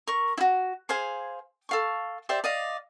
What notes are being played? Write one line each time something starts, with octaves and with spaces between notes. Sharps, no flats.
A#4 C#6
E4 F#4
G#4 C5 F5 G#5
A4 F5 C#6
G4 C5 D5 E5
D5 D#5 F5